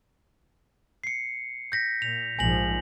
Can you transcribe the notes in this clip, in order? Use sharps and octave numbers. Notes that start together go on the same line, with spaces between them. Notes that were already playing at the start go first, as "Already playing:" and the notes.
C7 C#7
G6 A#6 B6
A#2 F7
A#1 G#2 F3 G#5 A#6 F#7